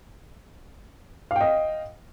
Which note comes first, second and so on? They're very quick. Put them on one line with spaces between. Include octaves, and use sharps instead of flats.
F5 G5 D#5